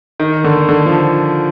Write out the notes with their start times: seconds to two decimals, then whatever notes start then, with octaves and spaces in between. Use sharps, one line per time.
0.20 D#3
0.44 D3
0.69 D3
0.86 F3